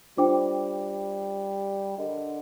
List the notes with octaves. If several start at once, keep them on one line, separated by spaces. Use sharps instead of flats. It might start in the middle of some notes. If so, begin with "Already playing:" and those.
G3 D4 F4 C5 G5 D6
D3 G4 A#4 D#5